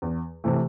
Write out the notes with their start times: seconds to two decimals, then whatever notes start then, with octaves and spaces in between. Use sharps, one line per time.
0.02 E2
0.44 C3 E3 A3